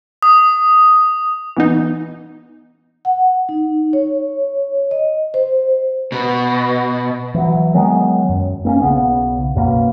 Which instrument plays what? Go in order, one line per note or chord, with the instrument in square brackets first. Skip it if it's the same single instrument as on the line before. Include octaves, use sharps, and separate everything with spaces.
[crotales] D#6
[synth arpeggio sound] E3 B3 D#4
[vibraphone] F#5
D#4
C#5
D#5
C5
[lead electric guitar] B2
[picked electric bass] E3 F#3
D#3 F#3 G#3 B3
F#2
A#3 C4 C#4
B1 C#3 B3
F#2 B2 A#3